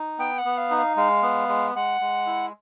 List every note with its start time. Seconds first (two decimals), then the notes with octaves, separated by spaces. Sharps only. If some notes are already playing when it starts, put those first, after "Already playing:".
Already playing: D#4
0.19 B3 G5
0.38 F#5
0.45 B3
0.57 F5
0.71 D#4
0.77 F5
0.97 G#3 F5
1.23 B3
1.49 G#3
1.75 G#3 F#5
2.01 G#3
2.26 E4